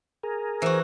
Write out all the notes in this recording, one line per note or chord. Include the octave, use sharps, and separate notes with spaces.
G#4 A#4
E3 F#4 C5